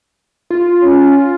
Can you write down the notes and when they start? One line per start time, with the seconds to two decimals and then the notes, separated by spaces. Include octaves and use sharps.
0.50 F4
0.82 C#4